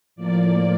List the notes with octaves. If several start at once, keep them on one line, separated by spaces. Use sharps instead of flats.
A2 F3 A#3 D5